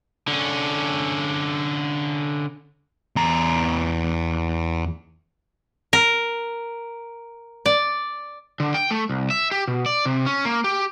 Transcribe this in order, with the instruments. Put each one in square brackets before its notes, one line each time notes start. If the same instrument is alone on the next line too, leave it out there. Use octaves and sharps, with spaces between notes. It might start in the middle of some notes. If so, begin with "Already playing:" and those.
[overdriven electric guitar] D3 C#4
[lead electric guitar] E2 A#5
[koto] A#4
D5
[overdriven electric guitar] D3
G5
A3
C2
E5
G4
B2
D5
C3
C#4
A#3
G4